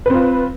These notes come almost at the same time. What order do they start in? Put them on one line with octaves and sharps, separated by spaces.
B4 C4 F4